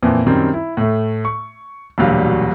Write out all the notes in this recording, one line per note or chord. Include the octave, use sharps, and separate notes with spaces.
F2 A#2 E3
F#2 D#3 G3 C4
E4
A2 A3
C#6
E1 D2 A#2 F#3 G3 F5